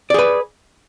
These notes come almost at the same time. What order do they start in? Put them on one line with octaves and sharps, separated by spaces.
D5 G#4 B4